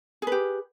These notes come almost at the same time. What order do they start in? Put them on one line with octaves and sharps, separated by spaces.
G#4 B4 G4